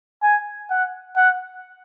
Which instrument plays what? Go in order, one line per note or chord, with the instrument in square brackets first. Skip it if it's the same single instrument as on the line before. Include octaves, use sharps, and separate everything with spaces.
[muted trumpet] G#5
F#5
F#5